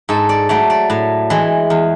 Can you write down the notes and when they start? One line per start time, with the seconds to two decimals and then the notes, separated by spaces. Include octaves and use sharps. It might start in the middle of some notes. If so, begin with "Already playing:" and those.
0.09 G#2 A4
0.29 D5
0.49 F#3 A3 D5
0.70 D5
0.90 A2
1.30 E3 G#3
1.70 E2